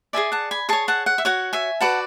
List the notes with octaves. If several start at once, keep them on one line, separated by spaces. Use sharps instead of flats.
G#4 B4 D5 E5 G#5
F#5 A5
G#5 B5
G#4 C#5 A5 C#6
F#5 A5
F#5
E5
F#4 C#5 F#5
E5 G#5
F#4 B4 D5 F#5 A5